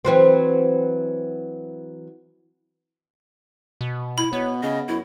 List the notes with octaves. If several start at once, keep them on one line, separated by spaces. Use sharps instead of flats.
E3 F#3 C4
B2
E4 B5
B2 B3 C#5
C#3 D#5
F#2 E4